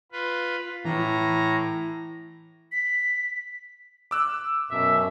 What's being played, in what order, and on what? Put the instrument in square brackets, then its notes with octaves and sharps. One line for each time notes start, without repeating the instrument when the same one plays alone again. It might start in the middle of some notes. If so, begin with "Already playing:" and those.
[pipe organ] F4 B4
[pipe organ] A2 A#5 [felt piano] E3
[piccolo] B6
[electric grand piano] D6 E6 F#6
[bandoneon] F#2 B2 [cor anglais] E5